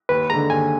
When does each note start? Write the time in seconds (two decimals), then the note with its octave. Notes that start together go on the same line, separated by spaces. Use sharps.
0.09 D#2 B4
0.30 D3 G#3 A#5
0.50 D#2 G#5